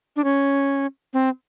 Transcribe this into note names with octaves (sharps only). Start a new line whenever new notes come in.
D4
C#4
C4